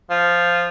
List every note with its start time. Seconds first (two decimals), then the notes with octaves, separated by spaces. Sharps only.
0.10 F3